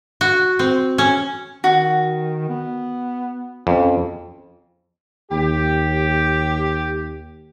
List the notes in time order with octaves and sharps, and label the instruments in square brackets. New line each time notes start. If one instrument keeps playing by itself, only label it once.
[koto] F#4
C4
C#4
[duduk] D#3 [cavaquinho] F#4
[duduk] B3
[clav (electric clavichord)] F2 [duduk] C#4
[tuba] D#2 [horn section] G4